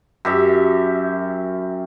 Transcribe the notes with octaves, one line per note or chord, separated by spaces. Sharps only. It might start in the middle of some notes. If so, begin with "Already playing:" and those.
F#2 G4 E5